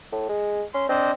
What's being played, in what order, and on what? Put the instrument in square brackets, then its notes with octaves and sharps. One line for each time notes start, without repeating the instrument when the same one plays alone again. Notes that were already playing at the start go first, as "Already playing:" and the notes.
[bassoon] A2
G#3
[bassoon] C#4 [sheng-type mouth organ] C6
[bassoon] C4 [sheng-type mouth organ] D4 C5 D#5